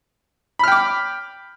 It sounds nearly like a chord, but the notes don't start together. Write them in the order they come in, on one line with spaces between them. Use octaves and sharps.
B5 F6 G5 D6